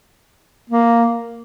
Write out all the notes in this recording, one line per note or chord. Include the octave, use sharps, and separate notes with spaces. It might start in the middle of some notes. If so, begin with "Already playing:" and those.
A#3